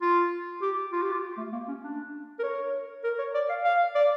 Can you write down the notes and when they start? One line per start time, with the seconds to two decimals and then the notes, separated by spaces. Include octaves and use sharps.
0.02 F4
0.62 G4
0.92 F4
1.02 G4
1.12 F4
1.37 A3
1.53 A#3
1.68 C#4
1.84 D4
2.39 A#4
2.43 C#5
3.04 A#4
3.19 C#5
3.35 D5
3.49 F5
3.65 F5
3.95 D5